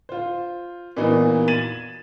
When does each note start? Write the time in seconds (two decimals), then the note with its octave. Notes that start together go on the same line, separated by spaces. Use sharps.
0.09 F4 C5
0.97 A#2 E3 B3 D#4 F#4
1.48 G#6 A6 D#7 E7 F#7